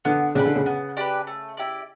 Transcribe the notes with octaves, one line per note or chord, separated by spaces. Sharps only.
D3 B3
C#3 D4 G4 B4
D3
C#3
B3
D4 G4 B4
A3
E4 G4 D5